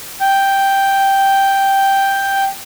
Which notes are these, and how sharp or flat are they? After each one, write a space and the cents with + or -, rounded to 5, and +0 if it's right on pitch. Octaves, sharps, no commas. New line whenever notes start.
G5 +0